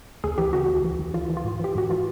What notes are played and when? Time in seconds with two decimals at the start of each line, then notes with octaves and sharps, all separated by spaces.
0.24 D2 G#4
0.38 E3 G4
0.53 C#3 F#4
0.68 D2
0.84 E3
0.99 D2
1.14 E3 F4
1.30 E3
1.37 F4
1.44 G#2
1.60 E3 G4
1.75 G#2 F#4
1.90 E3 F4